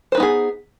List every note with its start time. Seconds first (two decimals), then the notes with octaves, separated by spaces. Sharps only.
0.12 C5
0.15 B4
0.17 D#4
0.20 B3
0.23 G#4